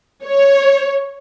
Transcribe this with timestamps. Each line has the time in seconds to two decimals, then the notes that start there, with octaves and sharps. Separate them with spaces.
0.24 C#5